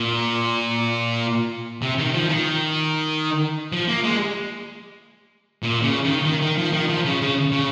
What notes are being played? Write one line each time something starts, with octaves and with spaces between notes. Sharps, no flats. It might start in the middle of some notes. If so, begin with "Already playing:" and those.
Already playing: A#2
C3
D#3
F3
D#3
F3
A#3
G#3
A#2
C#3
D#3
D#3
D#3
F3
D#3
F3
C#3
C#3
C#3